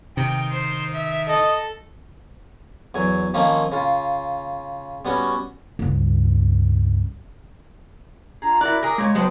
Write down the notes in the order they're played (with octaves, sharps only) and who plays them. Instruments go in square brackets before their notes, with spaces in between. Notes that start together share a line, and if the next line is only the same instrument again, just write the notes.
[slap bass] C3 [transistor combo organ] D#3 [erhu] G5
[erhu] C5
E5
[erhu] A4 [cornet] D#5
[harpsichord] E2 F#3 G#5
D#3 F3 A#3 C4 C#4
C#3 F4
G3 B3 C#4 F#4
[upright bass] C#2 G2
[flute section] D4 F4 [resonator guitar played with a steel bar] G#4 [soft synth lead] A#5
[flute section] E4 A#4 [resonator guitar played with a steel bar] F#4 D5 [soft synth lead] F#6
[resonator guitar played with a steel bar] G#4 A#4 [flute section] D6 [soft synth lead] A#6
[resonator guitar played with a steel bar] A#2 C#5 [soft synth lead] G#3
[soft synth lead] F#3 [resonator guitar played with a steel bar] G#3 B3 F#4 [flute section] C5 G5 A5